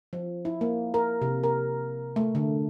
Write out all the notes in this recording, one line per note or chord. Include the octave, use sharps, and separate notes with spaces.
F3
E4
A#3
A#4
C3
A#4
A3
D3